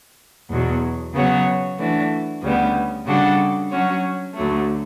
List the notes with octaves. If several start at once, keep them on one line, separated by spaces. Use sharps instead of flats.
E2 B2 F#3
C#3 F#3 B3 F#4 C#5
E3 A3 D4 F#4
D2 C#3 G3 B3
C#3 G3 D4 F#4 A4
F#3 C#4 F#4 C#5
D2 D3 F#3 A3